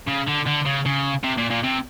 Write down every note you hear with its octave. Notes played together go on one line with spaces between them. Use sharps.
C#3
D3
D3
C#3
C#3
C3
A#2
A#2
C3